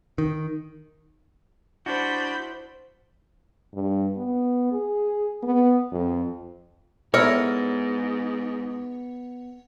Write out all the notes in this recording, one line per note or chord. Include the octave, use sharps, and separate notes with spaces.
D#3
D4 E4 F#4 C5 B5 G6
G2
B3
G#4
B3
F2
G#2 B3 E4 A#4 C#5